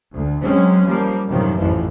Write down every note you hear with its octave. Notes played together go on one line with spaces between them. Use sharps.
D2
F#3 G#3 C4 C#4
F3 G3 A#3
F#2 A2 C3 D#3 F3
A1 F2 G#2 E3 F3